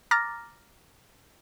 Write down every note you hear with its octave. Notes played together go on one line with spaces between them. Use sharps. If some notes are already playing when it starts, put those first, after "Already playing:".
A#5 D6 F6 A6 A#6